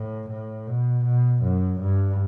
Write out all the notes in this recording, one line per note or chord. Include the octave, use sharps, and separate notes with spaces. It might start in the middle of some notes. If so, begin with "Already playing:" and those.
Already playing: A2
A2
B2
B2
F#2
G2